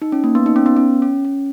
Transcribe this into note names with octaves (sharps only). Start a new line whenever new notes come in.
D#4
C#4
A#3
B3
D#4
C#4
B3
C#4
C#4
C#4